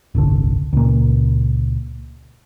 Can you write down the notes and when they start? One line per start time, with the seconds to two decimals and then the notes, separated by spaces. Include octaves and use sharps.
0.15 D1 G1 C2 D3
0.73 C#2 A#2